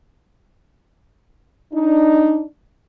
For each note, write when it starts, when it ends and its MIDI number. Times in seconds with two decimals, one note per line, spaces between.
1.73 2.43 62
1.73 2.43 63